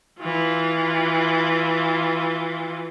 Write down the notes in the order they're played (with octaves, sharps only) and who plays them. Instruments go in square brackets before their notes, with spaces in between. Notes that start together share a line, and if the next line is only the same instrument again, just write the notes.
[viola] E3 F4